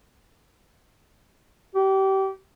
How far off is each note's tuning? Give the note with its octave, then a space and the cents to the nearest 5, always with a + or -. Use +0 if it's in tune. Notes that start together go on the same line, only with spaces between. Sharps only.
G4 -25